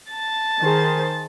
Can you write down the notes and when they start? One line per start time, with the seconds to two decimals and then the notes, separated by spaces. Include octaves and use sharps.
0.12 A5 A6
0.61 D#3 G#4 C5